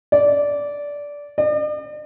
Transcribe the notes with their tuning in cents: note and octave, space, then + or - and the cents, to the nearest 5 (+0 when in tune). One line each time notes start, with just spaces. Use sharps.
D5 -15
D5 +45